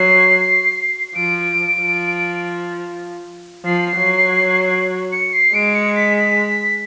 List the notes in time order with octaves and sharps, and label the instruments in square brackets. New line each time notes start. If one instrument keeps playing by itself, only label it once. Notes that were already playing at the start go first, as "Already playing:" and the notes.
Already playing: [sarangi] F#3 [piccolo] C7
[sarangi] F3 [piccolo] D7
[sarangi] F3
[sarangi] F3 [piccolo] C7
[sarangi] F#3
[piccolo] C#7
C7
[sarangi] G#3 [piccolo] D7
[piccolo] C#7
B6
B6